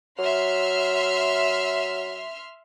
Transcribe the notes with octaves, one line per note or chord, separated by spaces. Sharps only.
F#3 E5 C6 F6